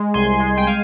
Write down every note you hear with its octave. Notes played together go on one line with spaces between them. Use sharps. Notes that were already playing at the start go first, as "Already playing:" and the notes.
Already playing: G#3
C2 G#5 C6
G#3
G5
F5 G#5